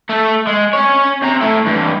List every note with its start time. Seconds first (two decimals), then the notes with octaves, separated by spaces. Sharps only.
0.09 A3 A4
0.47 G#3
0.73 C#4 C#5
1.22 C3 A#5
1.41 A3 E4
1.66 G2 E3